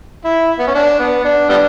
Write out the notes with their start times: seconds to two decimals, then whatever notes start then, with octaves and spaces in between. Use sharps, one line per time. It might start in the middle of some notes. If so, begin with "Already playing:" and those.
0.24 E4
0.59 B3
0.67 C#4
0.75 D4
0.99 B3
1.24 D4
1.49 G3 B3 D4